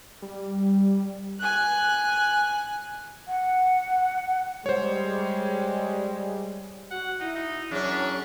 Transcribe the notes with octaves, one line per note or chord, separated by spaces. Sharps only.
G3
G#5 F#6
F#5
G3 G#3 C5 C#5
F#4 F#5
D#4 E4
D#4
F#2 C#4 D4 G#4